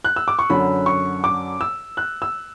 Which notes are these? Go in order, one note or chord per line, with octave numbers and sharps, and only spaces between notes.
F#6
E6
D6
C#6
F#2 D3 F#3 B5
C#6
D6
E6
F#6
E6